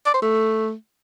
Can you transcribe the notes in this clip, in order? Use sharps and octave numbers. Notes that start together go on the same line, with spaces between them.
D5
C5
A3